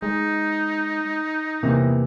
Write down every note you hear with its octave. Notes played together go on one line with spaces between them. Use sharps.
G#3 D#4
E2 C3 E3 A#3